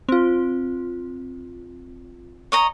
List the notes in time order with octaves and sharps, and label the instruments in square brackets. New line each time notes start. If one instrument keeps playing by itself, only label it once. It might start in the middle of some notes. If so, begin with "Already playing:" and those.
[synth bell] C4 F4
[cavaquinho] C#5 D#5 A#5